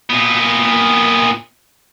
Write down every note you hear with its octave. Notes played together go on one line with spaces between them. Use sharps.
A#2 B3